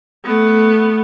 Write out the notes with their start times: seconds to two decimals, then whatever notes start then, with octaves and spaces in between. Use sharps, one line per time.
0.25 A3 B3